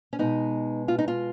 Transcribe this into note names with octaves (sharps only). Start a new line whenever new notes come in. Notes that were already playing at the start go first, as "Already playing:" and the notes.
C#4
B2 G#3 B3 D#4
F4
D#4
F4